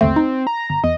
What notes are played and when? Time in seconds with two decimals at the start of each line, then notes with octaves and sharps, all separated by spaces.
0.01 G1 D#2 A3 C4
0.16 D#4
0.47 A#5
0.70 G1
0.84 E2 D#5